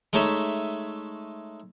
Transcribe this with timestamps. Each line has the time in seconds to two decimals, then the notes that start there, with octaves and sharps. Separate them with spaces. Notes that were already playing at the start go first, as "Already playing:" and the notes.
0.13 G#3 A3 D#4 C#5 E5